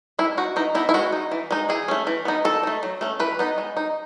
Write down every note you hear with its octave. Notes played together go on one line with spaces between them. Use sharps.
G#3 E4
D#4 F#4
E3 D#4
B3 D#4 E4
E4
G#3 F#4
D#4
E3
G#3 D#4
E3 G#4
A3 C#4
E3
B3 D#4
D#3 A4
A3 D#4
F#3
A3 C#4
E3 B4
B3 D#4
G#3
D#4